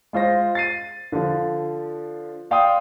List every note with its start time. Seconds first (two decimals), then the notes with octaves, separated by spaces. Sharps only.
0.13 G#3 F4 C5 A#6
0.55 A6 C7 D#7
1.12 D3 F3
2.51 D5 F5 G5 C6 D#6